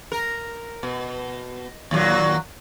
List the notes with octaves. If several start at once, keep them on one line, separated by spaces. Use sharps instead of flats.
A#4
B2
D#2 A#2 F#3